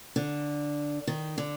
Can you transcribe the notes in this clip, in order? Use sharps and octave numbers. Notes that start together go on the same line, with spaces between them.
D3
D#3
D3